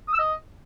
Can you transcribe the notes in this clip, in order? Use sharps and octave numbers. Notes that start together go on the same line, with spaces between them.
D#6
E6
D#5